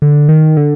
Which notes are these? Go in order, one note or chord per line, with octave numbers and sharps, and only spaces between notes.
D3
D#3
D3